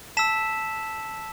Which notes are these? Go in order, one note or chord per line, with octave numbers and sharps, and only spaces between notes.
A5 E6 B6 E7